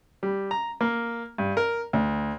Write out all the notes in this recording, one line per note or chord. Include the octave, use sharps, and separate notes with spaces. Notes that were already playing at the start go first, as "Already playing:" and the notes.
G3
A#5
A#3
G2
A#4
D2